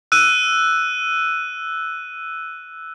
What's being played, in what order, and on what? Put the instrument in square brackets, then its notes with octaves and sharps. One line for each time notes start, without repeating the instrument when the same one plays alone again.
[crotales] E6 F#6 D#7